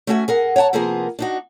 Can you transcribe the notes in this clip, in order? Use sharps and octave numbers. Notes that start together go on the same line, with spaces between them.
A3 C#4 F#4 E5 F#5 G#5
G#4 A#4 F#5
C#5 F#5 G5 A5 A#5
C3 F3 A#3 B3 G#4 A#4
D4 D#4 F#4